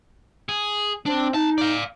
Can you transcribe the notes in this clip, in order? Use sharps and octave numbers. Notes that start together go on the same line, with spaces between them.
G#4
C4 D4
D#4 A5
D5 F5